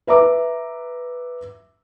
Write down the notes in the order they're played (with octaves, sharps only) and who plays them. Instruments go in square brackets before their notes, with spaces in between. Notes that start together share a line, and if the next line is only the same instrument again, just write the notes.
[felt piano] B4 E5 A#5 D6